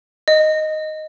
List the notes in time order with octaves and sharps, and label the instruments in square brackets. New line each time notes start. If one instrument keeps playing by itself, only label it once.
[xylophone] D#5